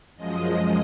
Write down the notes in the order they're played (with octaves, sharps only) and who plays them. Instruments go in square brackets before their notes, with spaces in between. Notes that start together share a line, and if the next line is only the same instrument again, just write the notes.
[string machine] F#2 F3 G#3 D#5